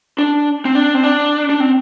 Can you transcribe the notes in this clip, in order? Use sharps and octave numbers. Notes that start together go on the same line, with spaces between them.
D4
C4
D4
C4
D4
D4
C4